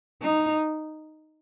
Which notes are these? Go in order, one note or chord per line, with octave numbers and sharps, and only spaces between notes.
D#4